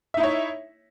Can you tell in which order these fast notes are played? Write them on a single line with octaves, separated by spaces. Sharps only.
E5 D#4 E4 C#5